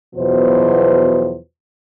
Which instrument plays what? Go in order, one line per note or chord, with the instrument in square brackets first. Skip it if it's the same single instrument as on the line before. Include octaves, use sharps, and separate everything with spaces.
[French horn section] E2 B2 F3 F#3 B4 C5